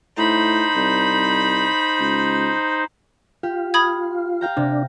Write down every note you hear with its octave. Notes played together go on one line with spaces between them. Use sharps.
A2 D#4 C5 B5
C2
C#2
F4 G4
B5 D#6 G#6
F5 G5 A#5
C3 D4